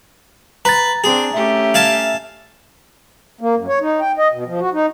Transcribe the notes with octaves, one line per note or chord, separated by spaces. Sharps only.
B4 A#5 A6
C4 D4 G#4
A3 C#4 G4 E5
F5 G#5 A5
A#3
F#2
C#5
D#4
G5
D#5
B2
F3
F#4
D#4